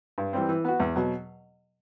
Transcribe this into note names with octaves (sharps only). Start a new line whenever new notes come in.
G2
E3 G3 C4
E3
B3 F#4
E2
B2 F#3